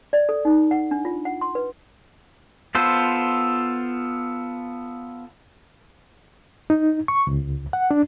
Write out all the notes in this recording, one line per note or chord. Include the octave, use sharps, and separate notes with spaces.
D5
A4
D#4
F#5
D4
F4
F#5
C6
B4
B3 F4 A4 C5
D#4
C#6
C#2
F#5
D4